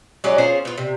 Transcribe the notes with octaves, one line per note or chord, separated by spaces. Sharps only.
F#3 G#3 C#4 D5
C#4 F4 G#4 C5
B3 F4
C3